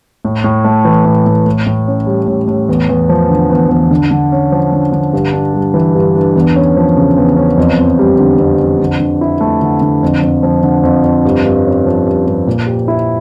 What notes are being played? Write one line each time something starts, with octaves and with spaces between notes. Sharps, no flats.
A2
A2
A3
E3
A2
A2
A2
A2
C#4
G3
A2
A2
E2
E2
F3
D3
E2
E2
D3
D3
C#4
F3
D3
D3
G2
D4
G3
E3
G2
D4
E2
C#4
F3
C#3
E2
C#4
F2
F2
G3
D3
F2
F2
D3
D3
E4
A3
D3
D3
F2
F2
F3
D3
F2
F2
G2
G2
C#4
F3
G2
G2
A#2
G4
E4